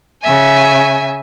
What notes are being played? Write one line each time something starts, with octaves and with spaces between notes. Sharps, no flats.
C#3 E5 G#5